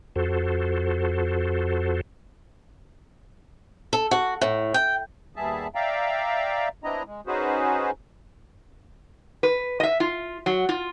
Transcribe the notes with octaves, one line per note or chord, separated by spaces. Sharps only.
F2 F#4 A4 C5
A4
F#4
A2
G5
D#2 G3 B3 G#4 E5 A5
D5 E5 F5 G5 A#5
B3 C4 D4 E4 D#5 A#5
G#3
C#4 D#4 F#4 G#4 B4 C5
B4
D#5 E5
F4
F#3
F4